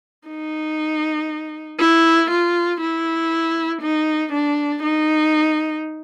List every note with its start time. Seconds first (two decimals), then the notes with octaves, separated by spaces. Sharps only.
0.28 D#4
1.80 E4
2.31 F4
2.81 E4
3.82 D#4
4.33 D4
4.83 D#4